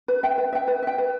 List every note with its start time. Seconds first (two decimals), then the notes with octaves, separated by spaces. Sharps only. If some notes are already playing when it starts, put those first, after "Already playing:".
0.08 B4
0.23 E5 G5
0.38 B4
0.53 E5 G5
0.68 B4
0.83 E5 G5
0.98 B4